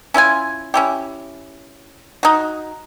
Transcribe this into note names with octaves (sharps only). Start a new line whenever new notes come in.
C#4 E4 F4 G#5
C#4 E4 G4
D#4 F#4